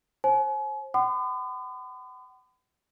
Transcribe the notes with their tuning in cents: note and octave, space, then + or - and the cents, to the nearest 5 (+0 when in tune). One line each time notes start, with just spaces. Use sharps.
C5 +30 G#5 +40
F#5 +40 B5 +45 D#6 -45